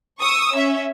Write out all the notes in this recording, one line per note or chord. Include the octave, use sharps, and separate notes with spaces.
C#6 D#6 E6
C#4 E5